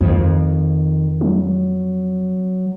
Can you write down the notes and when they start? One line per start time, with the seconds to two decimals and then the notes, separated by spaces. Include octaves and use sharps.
0.01 F2 D#3
1.21 F#3